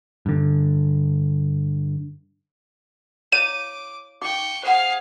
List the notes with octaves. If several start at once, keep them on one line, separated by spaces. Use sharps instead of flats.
G2 D3
E4 C#5 F5 D6 D#7
D#4 F5 G5 C#6 D6
G#4 C5 F5 F#5